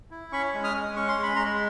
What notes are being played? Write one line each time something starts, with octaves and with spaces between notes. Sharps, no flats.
E4
C#4 B5 C#6
G#3
D#6 F6
G#3
C#4 C#6
C6
G#3
B5
G#3 A#5 C6